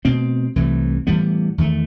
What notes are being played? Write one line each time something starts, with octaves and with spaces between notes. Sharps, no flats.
B2 A3 C4
C2 C3 E3 A3
A2 E3 G3 B3
E2 D#3 A3